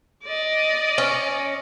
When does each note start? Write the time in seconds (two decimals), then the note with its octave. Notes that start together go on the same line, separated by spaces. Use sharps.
0.25 D5 D#5
0.98 C#4